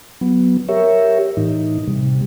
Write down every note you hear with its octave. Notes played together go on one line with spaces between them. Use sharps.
F#3 B3
G4 A#4 C#5 E5
A2 E3 D#4
C3 G3